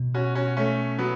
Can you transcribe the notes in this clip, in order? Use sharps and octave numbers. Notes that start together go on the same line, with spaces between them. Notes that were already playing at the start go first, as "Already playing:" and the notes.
Already playing: B2
C#4 F#4
C#4 F#4
A3 C#4
F#3 B3